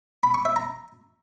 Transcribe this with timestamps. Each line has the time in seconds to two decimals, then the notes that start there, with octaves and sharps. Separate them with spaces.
0.23 B5
0.34 C#6
0.45 E5
0.56 A#5